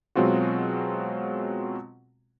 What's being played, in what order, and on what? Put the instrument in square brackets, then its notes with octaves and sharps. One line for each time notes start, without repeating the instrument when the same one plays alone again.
[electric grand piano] B2 F#3 G#3 C4 F4 F#4